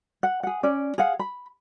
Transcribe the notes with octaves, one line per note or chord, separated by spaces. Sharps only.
F#5
G#4 F#5
C#4 D5
G#4 F5 F#5
B5